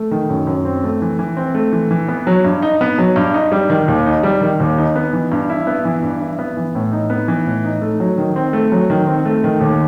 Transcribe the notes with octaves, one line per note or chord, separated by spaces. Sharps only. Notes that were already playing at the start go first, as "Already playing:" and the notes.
Already playing: A3
D#3
F#2
F#2
C4
A3
E3
E3
C4
A3
E3
E3
B3
F#3
G2
D#4
B3
F#3
G2
D#4
G3
D#3
D#2
D#4
G3
D#3
D#2
D#4
B3
E3
G2
E4
B3
E3
G2
E4
B3
E3
A2
D#4
B3
E3
A2
D#4
A3
F#3
D#3
C4
A3
F#3
D#3
C4
A3
D#3
D#2